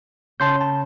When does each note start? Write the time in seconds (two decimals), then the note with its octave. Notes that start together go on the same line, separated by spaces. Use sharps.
0.40 C#3 A5 C6 G6
0.61 A5